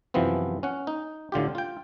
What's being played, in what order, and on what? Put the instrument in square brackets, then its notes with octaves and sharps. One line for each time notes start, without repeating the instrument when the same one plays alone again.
[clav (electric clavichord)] F#2 C3 E3 F3 B3 C4
C#4 F#5
D#4
A2 D3 F4 G4
F4 G5